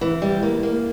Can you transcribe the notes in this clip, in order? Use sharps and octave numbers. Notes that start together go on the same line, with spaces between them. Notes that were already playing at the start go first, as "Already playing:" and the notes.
E3
G3
A#3
A#3